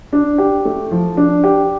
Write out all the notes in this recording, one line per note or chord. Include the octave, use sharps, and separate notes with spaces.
D4
G4
A3
F3
D4
G4